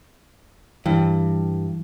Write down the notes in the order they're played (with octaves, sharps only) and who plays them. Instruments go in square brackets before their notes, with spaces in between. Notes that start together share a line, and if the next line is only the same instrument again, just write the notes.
[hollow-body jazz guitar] G2 [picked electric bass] E3